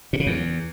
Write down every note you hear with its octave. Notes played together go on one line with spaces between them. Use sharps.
A#2
C#3
E2